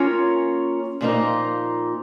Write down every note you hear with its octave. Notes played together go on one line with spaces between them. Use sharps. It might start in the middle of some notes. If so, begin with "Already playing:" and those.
Already playing: A#3 C#4 F4 A#4 C#5
A#2 F3 A#3 D#4